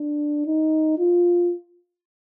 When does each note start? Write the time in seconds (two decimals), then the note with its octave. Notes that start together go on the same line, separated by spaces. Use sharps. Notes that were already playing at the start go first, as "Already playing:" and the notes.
Already playing: D4
0.46 D#4
0.98 F4